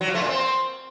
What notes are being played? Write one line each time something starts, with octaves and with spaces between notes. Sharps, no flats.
F#3
F3
A3
A#2
C4